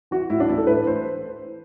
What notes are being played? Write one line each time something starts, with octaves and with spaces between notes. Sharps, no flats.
E3 F#4
A2 E4
D4
E3 E4
A4
A2 B4
E3 C5